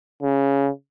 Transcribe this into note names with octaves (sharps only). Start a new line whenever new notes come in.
C#3